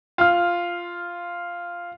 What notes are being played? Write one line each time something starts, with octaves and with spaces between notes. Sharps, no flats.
F4 F6